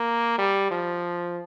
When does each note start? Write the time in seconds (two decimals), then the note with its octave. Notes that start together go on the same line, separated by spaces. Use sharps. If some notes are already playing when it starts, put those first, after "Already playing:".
Already playing: A#3
0.38 G3
0.71 F3